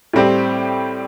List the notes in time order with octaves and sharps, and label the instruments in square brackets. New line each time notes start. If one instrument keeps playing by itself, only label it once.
[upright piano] A2 G3 C4 G4